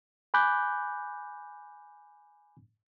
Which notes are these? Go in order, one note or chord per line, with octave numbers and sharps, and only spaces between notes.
G#5 B5 D6 F#6 G6